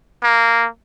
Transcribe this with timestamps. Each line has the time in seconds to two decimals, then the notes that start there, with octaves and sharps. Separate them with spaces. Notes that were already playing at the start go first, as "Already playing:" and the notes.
0.23 A#3